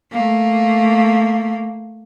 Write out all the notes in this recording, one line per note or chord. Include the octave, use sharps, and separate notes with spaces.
A3 A#3